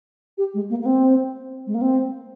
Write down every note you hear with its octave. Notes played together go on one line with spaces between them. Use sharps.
G4
G#3
A#3
A#3
C4
G#3
A#3
C4